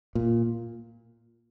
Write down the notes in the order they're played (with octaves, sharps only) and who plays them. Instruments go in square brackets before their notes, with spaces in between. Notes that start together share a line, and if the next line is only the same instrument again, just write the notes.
[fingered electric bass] A#2